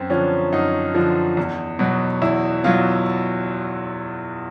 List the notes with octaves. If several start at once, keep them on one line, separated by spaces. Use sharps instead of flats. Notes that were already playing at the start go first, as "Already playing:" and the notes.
Already playing: F#2 C4
D3 F3 C#4
F#2 D#4
D3 F3
E2
B2 F#3
E2 E4
B2 F#3 F4